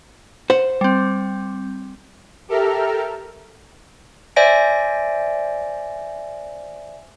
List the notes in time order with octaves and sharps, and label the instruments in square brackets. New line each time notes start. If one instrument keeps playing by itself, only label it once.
[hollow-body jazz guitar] C5 F#5
[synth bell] G3 C4
[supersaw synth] G4 A4 A#4 E5 A#5 F6
[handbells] C5 D5 E5 G#5 A#6 D7